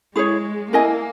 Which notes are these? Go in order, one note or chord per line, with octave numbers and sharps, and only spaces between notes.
G#3 E4 G#4 C#5
A#3 E4 A#4 D#5 G#5